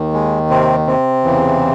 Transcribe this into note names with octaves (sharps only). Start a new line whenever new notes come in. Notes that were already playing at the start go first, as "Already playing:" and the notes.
Already playing: D#2 D#3
G#3
C3 C4
C3 C4
E2 C#3 E3